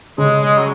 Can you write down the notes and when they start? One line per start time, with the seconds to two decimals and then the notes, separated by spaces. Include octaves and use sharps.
0.18 C#3 G#3
0.41 G#3
0.57 F#3